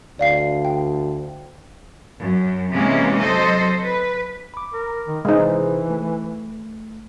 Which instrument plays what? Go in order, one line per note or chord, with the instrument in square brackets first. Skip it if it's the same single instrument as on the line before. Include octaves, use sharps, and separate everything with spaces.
[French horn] D2 [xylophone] D5 F5 C7
[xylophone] G5
[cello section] F#2
C3 E3 G#3 A#3 C#4
F#3 A4 C5 D#5
B4
[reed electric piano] B5 D6
[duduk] A#4
D#3
[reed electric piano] C3 G#4 C5 [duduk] E3 [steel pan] G#3 D#4
[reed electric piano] A3